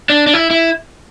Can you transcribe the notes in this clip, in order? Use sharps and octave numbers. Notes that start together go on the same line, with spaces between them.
D4
D4
E4
E4